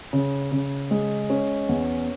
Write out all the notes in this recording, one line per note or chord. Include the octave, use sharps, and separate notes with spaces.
C#3
C#3
G#3
C#4
E2